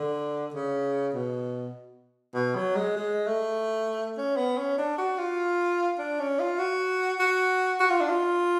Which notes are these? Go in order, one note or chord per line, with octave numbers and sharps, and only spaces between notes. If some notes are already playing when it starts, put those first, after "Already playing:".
Already playing: D3
C#3
B2
B2
F#3
G#3
G#3
A3
C#4
B3
C#4
D4
F#4
F4
D4
C#4
F4
F#4
F#4
F#4
F4
D4
F4